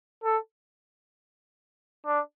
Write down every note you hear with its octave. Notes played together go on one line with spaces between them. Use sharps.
A4
D4